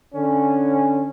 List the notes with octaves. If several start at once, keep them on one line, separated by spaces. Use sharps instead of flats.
D3 C#4